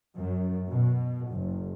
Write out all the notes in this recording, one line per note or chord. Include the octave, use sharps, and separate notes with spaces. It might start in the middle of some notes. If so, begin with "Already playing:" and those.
F#2
B2
F#1